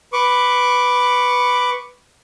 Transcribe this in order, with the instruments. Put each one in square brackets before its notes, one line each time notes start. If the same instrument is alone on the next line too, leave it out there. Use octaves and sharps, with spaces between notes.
[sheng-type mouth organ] B4 C#6 D6